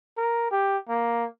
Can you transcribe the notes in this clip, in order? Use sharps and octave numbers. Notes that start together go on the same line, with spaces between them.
A#4
G4
A#3